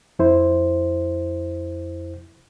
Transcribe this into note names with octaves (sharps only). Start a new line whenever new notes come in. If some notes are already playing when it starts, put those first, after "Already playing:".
F2 E4 C5